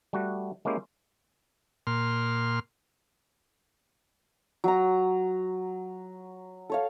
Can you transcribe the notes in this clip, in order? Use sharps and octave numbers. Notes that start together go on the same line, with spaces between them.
G3 A3 F#4
G#3 A#3 C#4 E4 G4
A#2 C6 F6
F#3 A#5
A4 C#5 F5